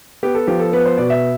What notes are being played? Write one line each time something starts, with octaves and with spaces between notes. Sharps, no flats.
B3 G4
A4
F3 G4
A4
B3 B4
C5
B2 D5
E5